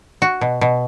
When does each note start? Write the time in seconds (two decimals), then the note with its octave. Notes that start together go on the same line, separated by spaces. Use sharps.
0.22 F#4
0.41 B2
0.61 B2